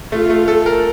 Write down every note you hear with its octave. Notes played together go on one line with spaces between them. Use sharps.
A3 F4
A3
A4
A#4